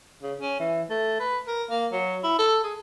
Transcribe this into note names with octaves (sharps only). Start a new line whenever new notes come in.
C#3
C#4
E3
A3
B4
A#4
A#3
F#3
E4
A4
G#4